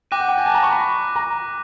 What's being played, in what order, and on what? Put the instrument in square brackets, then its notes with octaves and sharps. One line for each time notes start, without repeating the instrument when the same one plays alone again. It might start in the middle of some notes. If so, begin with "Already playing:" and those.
[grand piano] G5 [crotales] D6 F#6 A#6 D#7
[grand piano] F#5
G5
G#5
A5
A#5
C#6
B5
A#5